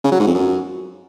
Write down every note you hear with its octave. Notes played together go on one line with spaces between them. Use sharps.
C#3
F#3
G#2
F2
F#2